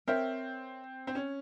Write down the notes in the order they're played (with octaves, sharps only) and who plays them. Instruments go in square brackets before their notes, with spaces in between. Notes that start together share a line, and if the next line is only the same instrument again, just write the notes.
[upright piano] C4 [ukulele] A#4 C#5 E5 G5
[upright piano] C4
C#4